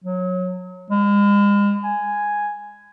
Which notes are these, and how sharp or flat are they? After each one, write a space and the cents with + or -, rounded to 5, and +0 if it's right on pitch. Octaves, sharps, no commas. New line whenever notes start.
F#3 -20
G#3 -40
G#5 +0